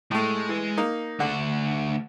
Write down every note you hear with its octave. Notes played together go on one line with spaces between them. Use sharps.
A2 G#3 A3
E3
A#3 D#4
D2 D3 F#4